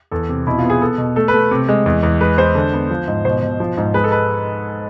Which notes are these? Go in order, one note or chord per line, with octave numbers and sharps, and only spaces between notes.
E2 A4
C3
B2 E4
F4
B3
G#4
B3 A4
B2
A3 A4
B4
A3
C3
G#3
E2
E2
G#3 B4
G#3 C5
D3
B3
F3
G#2
B2 C5
B2
F3
G#2
G#3 B4
A4
B4